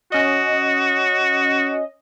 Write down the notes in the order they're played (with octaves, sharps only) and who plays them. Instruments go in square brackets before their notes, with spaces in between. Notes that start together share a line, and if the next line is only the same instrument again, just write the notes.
[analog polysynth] C#4 D#5 [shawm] F#4